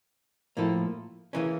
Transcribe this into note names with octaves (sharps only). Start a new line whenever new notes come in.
A2 F3 A#3 E4 A4
C#3 E3 A#3 C#4